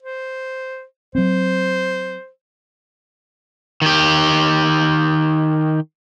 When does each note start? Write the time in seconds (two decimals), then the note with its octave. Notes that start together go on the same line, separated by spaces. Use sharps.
0.03 C5
1.15 F#3 C4 C5
3.82 D#3 G4